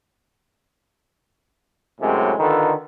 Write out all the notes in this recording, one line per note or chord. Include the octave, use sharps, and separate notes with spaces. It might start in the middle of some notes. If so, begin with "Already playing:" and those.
F#2 A2 C3 G#3
D3 D#3 F4 A4 B4